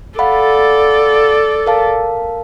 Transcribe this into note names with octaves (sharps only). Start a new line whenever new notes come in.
A4 D5 F5 F#5 B5
A#4 F5 A5